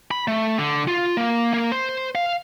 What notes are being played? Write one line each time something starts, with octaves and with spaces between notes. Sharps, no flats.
B5
A3
D3
F4
A#3
A#3
C5
F5